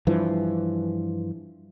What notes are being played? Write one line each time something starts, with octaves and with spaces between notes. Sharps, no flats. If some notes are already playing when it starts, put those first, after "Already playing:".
G2 E3 F3